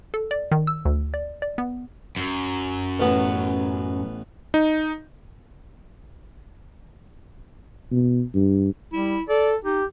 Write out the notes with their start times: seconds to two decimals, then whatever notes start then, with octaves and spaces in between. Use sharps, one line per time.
0.14 A4
0.31 D5
0.51 D#3
0.67 E6
0.85 D2
1.14 D5
1.42 D5
1.58 B3
2.16 F#2
3.00 A1 B3
4.54 D#4
7.91 B2
8.34 G2
8.92 G3 E4
9.29 A4 D5
9.64 D#4 G4